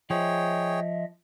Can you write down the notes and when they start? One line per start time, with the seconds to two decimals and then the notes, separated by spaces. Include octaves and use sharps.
0.10 F3 G#4 C#5 D#5 E5 G5